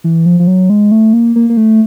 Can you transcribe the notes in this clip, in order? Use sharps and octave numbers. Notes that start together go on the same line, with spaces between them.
E3
F3
F3
F#3
G#3
A3
A#3
A#3
A#3
A3